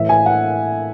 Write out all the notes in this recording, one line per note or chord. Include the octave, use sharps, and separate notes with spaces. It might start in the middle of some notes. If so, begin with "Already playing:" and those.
Already playing: A2 E3 E5
G#5
F#5